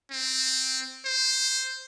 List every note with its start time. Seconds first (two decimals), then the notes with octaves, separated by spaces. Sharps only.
0.12 C4
1.06 C5